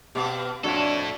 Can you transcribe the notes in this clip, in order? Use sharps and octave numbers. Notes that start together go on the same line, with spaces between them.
B2 C4 G4 D5 F5
F2 D4 E4 F#4 A4 C#5 D5